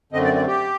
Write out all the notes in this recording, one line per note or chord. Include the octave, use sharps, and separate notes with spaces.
F#2 D3 A3 C4 D#5
D5
D5
G4